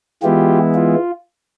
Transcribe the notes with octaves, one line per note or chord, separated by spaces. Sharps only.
E3 G#3 B3 E4 F4 G4
F4